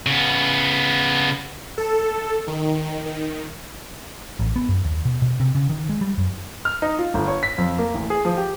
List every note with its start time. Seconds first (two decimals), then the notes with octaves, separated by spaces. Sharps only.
0.06 C#3 B3
1.78 A4
2.48 D#3
3.06 D#3
4.39 A1
4.56 B3
4.69 F#2
4.85 D#2
5.05 B2
5.22 B2
5.40 C3
5.55 C#3
5.70 D#3
5.89 G#3
6.01 G3
6.18 F#2
6.65 F6
6.82 D#4
6.99 F4
7.14 G1
7.28 C#5
7.43 B6
7.58 F2
7.78 A#3
7.94 A1
8.10 G#4
8.25 F3
8.37 G4